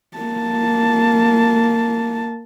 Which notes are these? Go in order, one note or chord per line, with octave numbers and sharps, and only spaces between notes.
A#3 A5